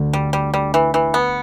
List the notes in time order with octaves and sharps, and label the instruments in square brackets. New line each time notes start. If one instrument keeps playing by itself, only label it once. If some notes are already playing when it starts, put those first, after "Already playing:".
Already playing: [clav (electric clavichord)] D2 D3
[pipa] G3
G3
G3
E3
E3
B3